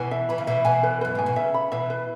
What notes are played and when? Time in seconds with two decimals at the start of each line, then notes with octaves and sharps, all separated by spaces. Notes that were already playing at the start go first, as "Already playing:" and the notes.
Already playing: B2 E3 G#5
0.11 E5
0.29 E3 B5
0.38 C#3
0.47 B2 E3 E5
0.65 B2 E3 G#5
0.83 B4
1.01 F#2 B4
1.15 G#2 G#5
1.26 B2
1.36 C#3 E5
1.54 B5
1.72 B2 E3 E5
1.90 B4